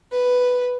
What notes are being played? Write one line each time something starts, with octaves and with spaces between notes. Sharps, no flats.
B4